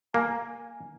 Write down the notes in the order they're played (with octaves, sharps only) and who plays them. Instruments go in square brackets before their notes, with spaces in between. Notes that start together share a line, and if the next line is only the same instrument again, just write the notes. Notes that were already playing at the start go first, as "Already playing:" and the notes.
[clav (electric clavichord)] A#3 [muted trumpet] G#5